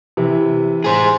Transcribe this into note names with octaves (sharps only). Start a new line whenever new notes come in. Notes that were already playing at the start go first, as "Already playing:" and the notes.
C3 E3
G#4 C5